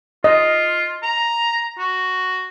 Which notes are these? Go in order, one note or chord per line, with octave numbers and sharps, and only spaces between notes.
F4 D#5
A#5
F#4